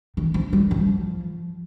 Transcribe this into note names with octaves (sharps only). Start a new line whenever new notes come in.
D#3
F3
G3
F3